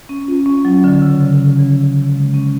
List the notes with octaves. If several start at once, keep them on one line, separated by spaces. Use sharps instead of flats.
C#4
F4
C#4
F#3
D3
C#3
C#3
C#4
F3
C#3
C#3
G#3
C#4